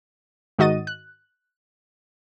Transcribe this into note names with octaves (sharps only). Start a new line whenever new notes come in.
G#2 D#3 F#4 D#5 A6 D#7
F#6